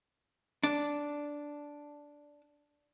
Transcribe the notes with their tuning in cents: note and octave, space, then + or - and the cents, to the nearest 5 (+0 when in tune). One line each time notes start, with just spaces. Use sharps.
D4 -5